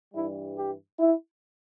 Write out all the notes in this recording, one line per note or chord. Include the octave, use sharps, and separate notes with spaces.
G2 E3 G3 E4
G4
E4